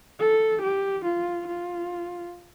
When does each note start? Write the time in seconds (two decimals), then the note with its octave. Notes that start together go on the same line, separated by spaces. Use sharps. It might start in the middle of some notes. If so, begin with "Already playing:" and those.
0.19 A4
0.61 G4
1.04 F4
1.47 F4